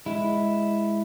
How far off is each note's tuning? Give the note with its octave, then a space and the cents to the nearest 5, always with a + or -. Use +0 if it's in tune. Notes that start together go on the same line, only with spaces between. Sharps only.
G#3 +0 E4 +0